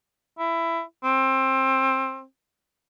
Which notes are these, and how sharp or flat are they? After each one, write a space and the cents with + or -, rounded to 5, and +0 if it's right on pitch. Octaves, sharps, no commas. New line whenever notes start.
E4 +15
C4 +20